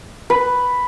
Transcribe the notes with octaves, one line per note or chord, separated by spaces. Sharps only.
B4